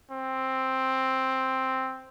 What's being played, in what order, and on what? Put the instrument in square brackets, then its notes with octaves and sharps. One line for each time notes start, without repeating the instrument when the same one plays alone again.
[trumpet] C4